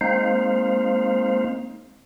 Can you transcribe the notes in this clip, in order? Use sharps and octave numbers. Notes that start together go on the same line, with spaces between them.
G#3 A#3 C4 D#4 C5 F5